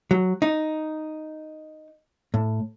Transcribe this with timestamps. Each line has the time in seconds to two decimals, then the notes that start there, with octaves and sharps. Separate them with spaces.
0.11 F#3
0.42 D#4
2.34 A2